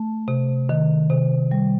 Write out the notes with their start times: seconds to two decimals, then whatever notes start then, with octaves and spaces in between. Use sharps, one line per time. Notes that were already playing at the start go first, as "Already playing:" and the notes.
Already playing: A3
0.28 C3
0.69 D#3
1.10 C3
1.51 G3